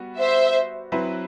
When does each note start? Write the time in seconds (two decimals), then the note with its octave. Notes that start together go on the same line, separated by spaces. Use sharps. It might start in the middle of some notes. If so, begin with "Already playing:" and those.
Already playing: G3 B3 F#4
0.19 C5 E5
0.92 F#3 C4 E4 B4 E5